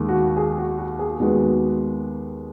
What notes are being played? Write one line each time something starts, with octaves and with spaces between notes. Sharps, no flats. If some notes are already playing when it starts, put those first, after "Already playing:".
Already playing: D#2 D#3 G#3
F#4
G#4
F#4
F#4
G#4
D#2 D#3 G#3 B3 F#4